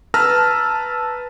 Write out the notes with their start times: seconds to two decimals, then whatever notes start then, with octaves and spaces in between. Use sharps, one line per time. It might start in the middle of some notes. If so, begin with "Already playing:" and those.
0.14 B4 A5 A#5 E6 F6 A#6